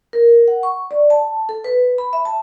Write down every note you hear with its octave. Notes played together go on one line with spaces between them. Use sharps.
A#4
F#5
C#6
D5
A5
A4
B4
B5
E5
A5